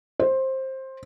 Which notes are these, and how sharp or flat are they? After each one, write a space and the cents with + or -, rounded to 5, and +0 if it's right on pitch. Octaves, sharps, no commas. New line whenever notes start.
C5 +15